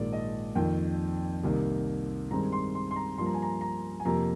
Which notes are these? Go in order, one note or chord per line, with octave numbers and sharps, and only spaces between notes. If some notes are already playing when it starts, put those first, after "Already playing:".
Already playing: A#1 G#2 D#3 A#3 D5
D#5
F2 D#3 A#3 G5
C2 C3 D#3 A#3
G2 D#3 G#3 C4 A#5
C6
C6
C6
A#5
G2 F3 A#3 C6
A#5
G#5
A#5
A#5
G#5
F2 C3 F3 A#3 A#5